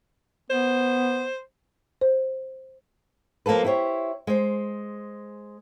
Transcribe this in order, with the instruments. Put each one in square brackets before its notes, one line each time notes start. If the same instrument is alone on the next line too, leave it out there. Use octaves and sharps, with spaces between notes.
[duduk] B3 [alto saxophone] C5
[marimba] C5
[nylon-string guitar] F3 A#3 F4 A4 B4
E4 G4 C5 C#5
G#3 C5